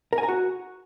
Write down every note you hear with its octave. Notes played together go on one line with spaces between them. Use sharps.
A#4
G#5
A#5
F#4